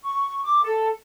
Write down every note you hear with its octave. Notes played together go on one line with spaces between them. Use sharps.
C#6
D6
A4